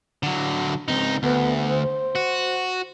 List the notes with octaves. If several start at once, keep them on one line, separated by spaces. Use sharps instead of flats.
D3 F#3
C#2 C4 D#4
D2 B3
C5
F#4